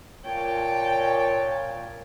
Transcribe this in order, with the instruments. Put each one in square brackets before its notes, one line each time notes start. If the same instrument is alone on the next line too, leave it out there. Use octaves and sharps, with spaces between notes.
[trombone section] A#2 [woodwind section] C#5 [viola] G5 A5